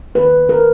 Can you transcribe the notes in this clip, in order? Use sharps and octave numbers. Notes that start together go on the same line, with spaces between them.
D#3 A#3 B4
A#4